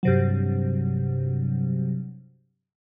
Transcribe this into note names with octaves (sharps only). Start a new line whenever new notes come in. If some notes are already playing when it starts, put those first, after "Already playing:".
G2 C3 F#3